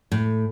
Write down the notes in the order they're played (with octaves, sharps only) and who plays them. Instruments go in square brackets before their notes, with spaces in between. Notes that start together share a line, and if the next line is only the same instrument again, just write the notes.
[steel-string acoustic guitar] A2